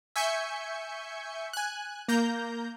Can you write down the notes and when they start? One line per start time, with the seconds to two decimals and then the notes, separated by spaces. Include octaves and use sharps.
0.16 E5 G#5 C#6 G6 C#7
1.53 G#5 F#6
2.08 A#3 A#5 G6